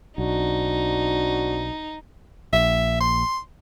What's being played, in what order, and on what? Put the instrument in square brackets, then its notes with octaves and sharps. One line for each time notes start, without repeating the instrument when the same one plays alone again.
[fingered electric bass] B1 [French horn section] C4 D4 F#4 [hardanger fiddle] D#4
[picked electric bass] A#1 [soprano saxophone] E5
[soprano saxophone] C6